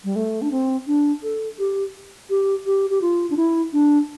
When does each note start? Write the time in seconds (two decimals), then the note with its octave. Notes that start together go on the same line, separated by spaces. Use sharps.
0.04 G3
0.16 A3
0.42 D4
0.51 C4
0.87 D4
1.23 A4
1.59 G4
2.30 G4
2.66 G4
2.90 G4
3.02 F4
3.30 D4
3.37 E4
3.73 D4